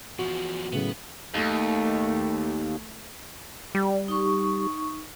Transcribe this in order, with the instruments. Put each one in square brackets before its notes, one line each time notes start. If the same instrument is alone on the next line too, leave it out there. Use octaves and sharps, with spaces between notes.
[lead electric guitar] E2 F3 [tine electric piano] F#4
[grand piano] A2 C#3 F#3 [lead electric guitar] B3
[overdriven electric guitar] D#2 [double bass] A3
[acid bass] G3
[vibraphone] D#4 C#6